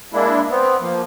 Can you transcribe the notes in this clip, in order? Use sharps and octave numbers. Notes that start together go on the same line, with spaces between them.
G#3 A#3 D4 E4
B3 C4
F3 A#3